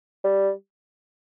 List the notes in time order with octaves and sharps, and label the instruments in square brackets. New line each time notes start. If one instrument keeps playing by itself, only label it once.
[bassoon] G3